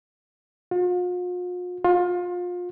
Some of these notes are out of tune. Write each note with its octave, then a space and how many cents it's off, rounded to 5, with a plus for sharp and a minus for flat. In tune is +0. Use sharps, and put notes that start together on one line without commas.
F4 +45
F4 +30